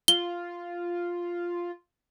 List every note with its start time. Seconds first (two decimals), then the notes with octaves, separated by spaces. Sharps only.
0.08 F4 G7